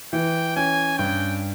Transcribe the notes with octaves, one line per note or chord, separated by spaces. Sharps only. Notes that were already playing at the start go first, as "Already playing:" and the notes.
E3 G5
C#4 G#5
G2 G5